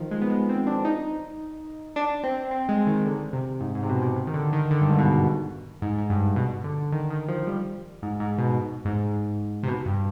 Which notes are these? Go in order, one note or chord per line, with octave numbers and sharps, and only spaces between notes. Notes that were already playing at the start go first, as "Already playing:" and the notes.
Already playing: D#3 F3
G#3
B3
G#3
C4
D4
D#4
D4
C4
C4
G#3
D#3
D3
C3
G#2
G#2
C3
B2
C3
C3
D#3
D3
D#3
D3
G2
G#2
B2
G#2
G#2
G2
B2
D3
D#3
D#3
F3
G3
G#2
G#2
B2
G#2
C3
B2
G2